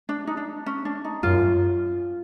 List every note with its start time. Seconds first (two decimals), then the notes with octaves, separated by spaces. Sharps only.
0.09 D4
0.27 D#4
0.37 D4
0.66 C#4
0.85 D4
1.05 D#4
1.23 F#2 F4